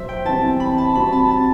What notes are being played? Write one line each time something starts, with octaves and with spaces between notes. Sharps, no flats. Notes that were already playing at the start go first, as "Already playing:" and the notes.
Already playing: B2 F#3 C5 E5
G5
E3 G3 C4 A5
B5
A5
G3 C4 F#4 B5
A5
A5